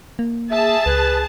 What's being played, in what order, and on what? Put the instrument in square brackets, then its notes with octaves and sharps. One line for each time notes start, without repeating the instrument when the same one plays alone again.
[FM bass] A#3
[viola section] G#4 A5 [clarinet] E5
[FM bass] C#2 [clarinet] B4